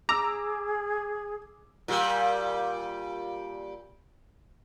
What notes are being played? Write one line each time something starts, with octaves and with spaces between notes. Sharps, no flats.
G#4 A#5 D6 E6
A#2 G3